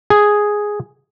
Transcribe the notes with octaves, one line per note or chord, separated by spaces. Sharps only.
G#4